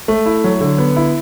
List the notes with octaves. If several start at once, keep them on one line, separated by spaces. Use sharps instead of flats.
A3
E4
F#3
D3
B3
E4